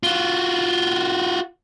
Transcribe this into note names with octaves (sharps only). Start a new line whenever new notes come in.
F4 F#4